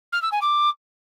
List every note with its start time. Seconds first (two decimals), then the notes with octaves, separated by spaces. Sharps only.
0.13 F6
0.22 E6
0.32 G#5
0.42 D6